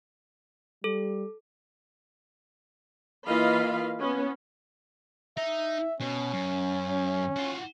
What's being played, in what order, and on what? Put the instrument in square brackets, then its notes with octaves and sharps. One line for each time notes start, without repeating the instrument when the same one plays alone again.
[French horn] G3 [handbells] A4
[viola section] E3 A#3 F4 D#5 F5 B5
B3 C#4
[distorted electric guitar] D#4 [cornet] E5
[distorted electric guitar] B2 [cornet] C#4
[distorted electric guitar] F#2
F4 F#4